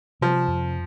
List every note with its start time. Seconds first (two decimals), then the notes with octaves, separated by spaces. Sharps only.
0.21 C3 F3
0.48 F2